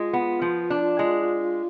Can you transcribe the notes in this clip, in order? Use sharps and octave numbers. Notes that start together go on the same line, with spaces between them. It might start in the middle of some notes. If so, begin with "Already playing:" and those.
Already playing: G#3 F4
B3
F3
D4
G#3